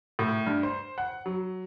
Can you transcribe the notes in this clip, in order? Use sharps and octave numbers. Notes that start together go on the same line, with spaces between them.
A2
G2
C5
F#5
F#3